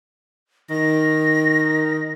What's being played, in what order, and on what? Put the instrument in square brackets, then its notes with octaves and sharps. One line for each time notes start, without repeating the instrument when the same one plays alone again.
[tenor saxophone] D#3 [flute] A#6